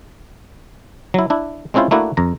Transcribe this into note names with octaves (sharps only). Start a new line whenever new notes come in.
F#3 E4
D4 E4
G#3 C4 C#4 E4 F4 C5
A3 A#3 D4 E4 F#4
F2 A#5